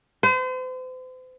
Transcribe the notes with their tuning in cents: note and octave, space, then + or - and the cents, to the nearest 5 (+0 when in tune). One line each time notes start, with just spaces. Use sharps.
C5 -40